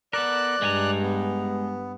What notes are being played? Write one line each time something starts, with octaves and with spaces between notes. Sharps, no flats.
B3 A4 A#4 D5 F#6
G2 G#3 G#5 A#5
B3